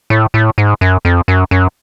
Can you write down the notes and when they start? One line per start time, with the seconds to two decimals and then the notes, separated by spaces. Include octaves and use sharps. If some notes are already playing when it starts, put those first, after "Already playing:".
0.10 A2
0.34 A2
0.58 G#2
0.81 F#2
1.05 F2
1.28 F#2
1.51 F#2